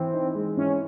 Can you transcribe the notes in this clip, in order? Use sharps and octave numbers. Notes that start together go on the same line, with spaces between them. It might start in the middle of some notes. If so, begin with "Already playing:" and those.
Already playing: E3 C4
D#4
G#3
E3 C#4